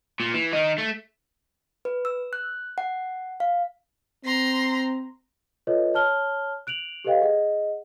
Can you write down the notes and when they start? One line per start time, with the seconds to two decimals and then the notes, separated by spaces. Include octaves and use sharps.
0.20 A#2
0.34 E3
0.53 D#3 D#4
0.78 A3
1.85 B4
2.05 E6
2.33 F#6
2.78 F#5
3.40 F5
4.25 C4 A#5 C6
5.67 F4 A4 B4 C#5 D#5
5.94 C#5 A5 F6 G7
6.67 F#6 D7 F7 F#7
7.05 G4 A4 B4 D#5 F5 G5
7.22 G#4 D#5 F#5